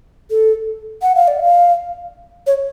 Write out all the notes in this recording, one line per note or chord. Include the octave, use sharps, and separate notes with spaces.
A4
F#5
F5
D5
F5
C#5